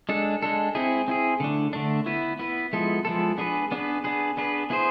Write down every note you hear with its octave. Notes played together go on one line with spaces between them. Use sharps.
G#3 D4 A4
G#3 D4 A4
C4 E4 G#4
C4 E4 G#4
D3 A3 D4
D3 A3 D4
B3 E4 B4
B3 E4 B4
F3 G#3 B3 E4 A4
F3 G#3 B3 E4 A4
B3 D4 G#4 B4
B3 D4 G#4 B4
B3 D4 G#4 B4
B3 D4 G#4 B4
B3 E4 G#4 C5